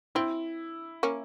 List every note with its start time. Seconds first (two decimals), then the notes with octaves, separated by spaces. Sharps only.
0.15 C4 E4
1.03 A#3 C#4